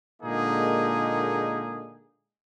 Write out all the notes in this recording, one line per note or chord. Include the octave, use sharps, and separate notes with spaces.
A#2 D3 G#3 A#3 D#4 G#4